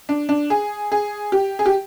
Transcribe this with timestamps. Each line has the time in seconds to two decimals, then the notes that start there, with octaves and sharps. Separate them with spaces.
0.09 D4
0.29 D4
0.50 G#4
0.92 G#4
1.32 G4
1.59 G#4
1.66 G4